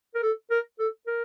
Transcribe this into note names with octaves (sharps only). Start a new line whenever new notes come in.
A#4
A4
A#4
A4
A#4